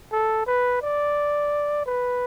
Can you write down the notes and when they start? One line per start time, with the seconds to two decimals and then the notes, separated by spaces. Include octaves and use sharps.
0.12 A4
0.47 B4
0.82 D5
1.86 B4